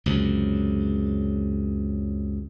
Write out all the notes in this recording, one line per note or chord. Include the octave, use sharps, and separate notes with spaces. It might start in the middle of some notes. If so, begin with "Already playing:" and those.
C#2 F#2 C3